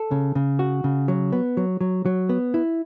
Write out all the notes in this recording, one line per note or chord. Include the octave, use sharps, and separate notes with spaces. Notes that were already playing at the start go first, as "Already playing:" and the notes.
Already playing: A4
C#3
C#3
F#4
C#3
F#3
B3
F#3
F#3
F#3
B3
E4